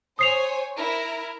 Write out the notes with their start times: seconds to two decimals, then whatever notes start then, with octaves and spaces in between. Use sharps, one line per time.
0.19 C5 C#5 G#5 D#6 C7 F7
0.79 E4 A#4